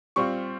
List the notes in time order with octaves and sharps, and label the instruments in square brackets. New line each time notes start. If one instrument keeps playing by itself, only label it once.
[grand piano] G3 C4 F4 C#6